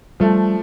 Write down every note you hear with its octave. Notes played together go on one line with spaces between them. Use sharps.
F3 G3 A3